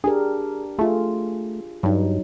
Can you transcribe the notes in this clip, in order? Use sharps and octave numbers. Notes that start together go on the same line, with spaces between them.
D4 G4 G#4 A#4
A3 F4 G#4
G2 F#3 D#4